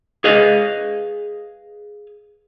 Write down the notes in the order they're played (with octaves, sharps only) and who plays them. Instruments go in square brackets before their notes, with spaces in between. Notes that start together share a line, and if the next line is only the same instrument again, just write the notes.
[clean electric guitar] G#4 B4 D#5 F5